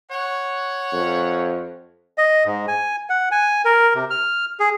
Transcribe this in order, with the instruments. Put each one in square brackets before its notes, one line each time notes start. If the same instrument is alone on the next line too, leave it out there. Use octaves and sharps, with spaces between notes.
[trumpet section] C#5 F#5
[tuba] F2
[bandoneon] D#5
G#2
G#5
F#5
G#5
A#4
C3
F6
G#4